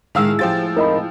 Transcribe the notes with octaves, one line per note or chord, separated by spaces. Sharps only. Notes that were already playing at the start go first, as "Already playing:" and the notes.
A2 D#3 G#3 F5 E6
F3 F4 G4 C5 G5 A6
F2 D#4 E4 A#4 D#5 B5